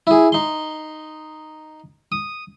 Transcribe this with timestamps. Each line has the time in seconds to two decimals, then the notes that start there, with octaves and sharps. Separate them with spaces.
0.07 E4 G#4
0.32 D#4 C6
2.12 D#6